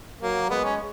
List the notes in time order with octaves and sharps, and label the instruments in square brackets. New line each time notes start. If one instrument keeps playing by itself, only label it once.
[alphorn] F#3 [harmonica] A#3
[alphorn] G#3 [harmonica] B3
[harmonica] C#4